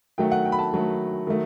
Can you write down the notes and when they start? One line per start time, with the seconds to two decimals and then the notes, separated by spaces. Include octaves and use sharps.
0.18 D#3 F#3 A3 G5
0.32 F#5
0.45 G5
0.52 B5
0.59 A5
0.73 D#3 F#3 A3
1.27 D#3 F#3 A3